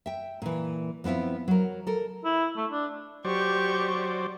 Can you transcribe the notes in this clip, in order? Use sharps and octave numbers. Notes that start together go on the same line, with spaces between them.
E5 G5
A#2 E3
F3 B3 C4 E4 F4
F#3 A#4
A4 A#4
E4
A3
D4
F#3 G4 C5 D5 C#6 G6